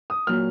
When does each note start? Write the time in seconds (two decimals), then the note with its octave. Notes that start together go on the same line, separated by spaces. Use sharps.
0.10 D#6
0.27 A#2 F#3 F6